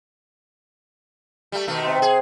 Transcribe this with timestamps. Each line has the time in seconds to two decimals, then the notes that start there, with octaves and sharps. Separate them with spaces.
1.52 G3 A3
1.68 B2 D#3 A3
1.82 C3 F#5 C6
2.02 G#4